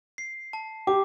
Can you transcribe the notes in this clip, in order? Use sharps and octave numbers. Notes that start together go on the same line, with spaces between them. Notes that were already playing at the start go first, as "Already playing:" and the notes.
C7
A5
G4 D6